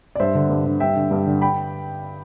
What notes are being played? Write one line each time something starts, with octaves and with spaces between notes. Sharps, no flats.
D5
G2 C5 E5
D3
G2
D3
G2 E5 G5
D3
G2
D3
G5 B5